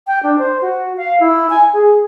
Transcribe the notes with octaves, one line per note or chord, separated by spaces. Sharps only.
G5
D4
C5
F#4
F5
E4
G#5
G#4